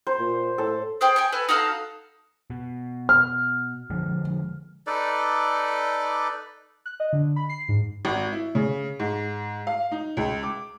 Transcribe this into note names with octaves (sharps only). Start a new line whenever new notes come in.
C5
A#2
A2 A4
G#4 C5 G5
G5 G#5 C#6
A4 B4 G#5 F#6
D#4 F#4 A4 F5
B2
F6
D3 F3 G#3
D#4 A4 B4 D5
F#6
D#5
D3
B5
C7
G#2
G#1
E4
C#3
G#2
F5
D#4
C#2
D6